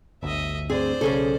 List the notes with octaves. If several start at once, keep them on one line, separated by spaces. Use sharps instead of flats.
G1 D2 D#5 E5
D2 G2 C4 G#4 C5 D5
B1 C#3 C#4 G#4 A4